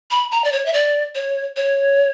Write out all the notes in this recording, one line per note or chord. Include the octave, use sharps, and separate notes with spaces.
B5
A#5
D5
C#5
E5
D5
C#5
C#5